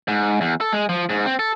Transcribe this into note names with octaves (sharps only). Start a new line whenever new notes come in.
G#2
E2
A4
G#3
F3
G#2
C4
A4